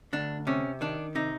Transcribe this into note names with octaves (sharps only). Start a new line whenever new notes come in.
D2 D4
C3 C#4
D#3 D4
C3 D#4